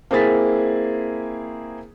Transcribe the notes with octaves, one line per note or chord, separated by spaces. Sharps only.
A#3 C4 E4 G#4 A6 B6